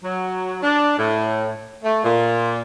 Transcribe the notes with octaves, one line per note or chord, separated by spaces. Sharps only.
F#3
D4
A2
A3
A#2